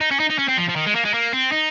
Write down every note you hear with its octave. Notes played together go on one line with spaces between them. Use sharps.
D#4
C#4
D#4
D#4
C#4
C4
F3
F3
D#3
G#3
A#3
G#3
A#3
C4
D#4